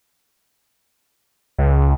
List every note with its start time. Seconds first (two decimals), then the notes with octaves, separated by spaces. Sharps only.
1.58 C#2